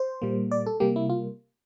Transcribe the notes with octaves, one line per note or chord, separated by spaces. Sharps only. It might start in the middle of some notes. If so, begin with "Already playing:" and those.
Already playing: C5
A#2 G3 A#3
D5
A4
C3 G3 A#3 G4
E4
F4